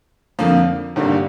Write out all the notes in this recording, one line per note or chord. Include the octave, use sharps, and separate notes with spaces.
F2 D3 F3 A#3
G#1 G2 D3 G3 A#3